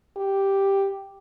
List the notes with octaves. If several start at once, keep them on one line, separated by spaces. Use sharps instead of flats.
G4